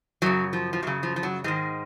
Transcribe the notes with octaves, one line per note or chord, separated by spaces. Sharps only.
F#2 C#3 F#3
F3
F3
F#2 C#3 F#3
F3
F3
F#3
G#2 D#3 G#3